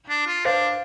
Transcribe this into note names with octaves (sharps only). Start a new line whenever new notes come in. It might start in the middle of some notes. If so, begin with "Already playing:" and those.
D4
F4
D4 C5 F5